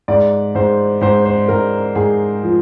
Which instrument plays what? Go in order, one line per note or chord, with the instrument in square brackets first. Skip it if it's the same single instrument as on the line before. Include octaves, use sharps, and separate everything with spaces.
[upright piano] G#2 D5
G#2 C5
G#2 C5
C5
G#2 A#4
G#2 G#4
F3